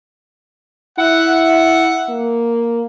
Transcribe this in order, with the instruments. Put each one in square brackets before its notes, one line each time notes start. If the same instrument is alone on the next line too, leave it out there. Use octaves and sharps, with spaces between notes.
[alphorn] E4 [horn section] E5 F#5
[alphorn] A#3